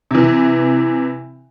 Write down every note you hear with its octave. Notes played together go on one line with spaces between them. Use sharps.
C3 E3